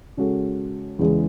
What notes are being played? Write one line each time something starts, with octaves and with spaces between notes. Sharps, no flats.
C#3 G#3 C#4 F#4 A4
E2 C#3 E3 G#3